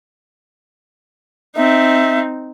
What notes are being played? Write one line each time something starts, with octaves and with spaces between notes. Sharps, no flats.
C4 D#4 E5